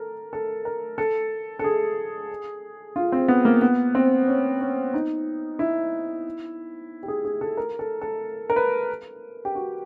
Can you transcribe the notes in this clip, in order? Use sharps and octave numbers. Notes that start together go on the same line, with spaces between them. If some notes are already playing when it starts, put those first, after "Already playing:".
Already playing: A4 A#4
A4
A#4
A4
A4
G#4
F4
C4
B3
A#3
B3
C4
C#4
C#4
D#4
E4
G4
G#4
G#4
A4
A#4
A4
A4
A#4
B4
G4
F#4